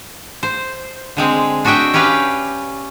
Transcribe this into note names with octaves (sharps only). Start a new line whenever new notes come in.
C5
D3 G#3 C4
D4 F#4 D#5 E5 G5
C#4 G4 B4 D5 F5 G5